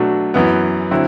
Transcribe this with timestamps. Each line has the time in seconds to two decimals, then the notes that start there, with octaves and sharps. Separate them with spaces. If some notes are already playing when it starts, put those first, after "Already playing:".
Already playing: B2 F#3 A3 D4 F#4
0.34 F#2 E3 B3
0.91 D3 F#3 C4 E4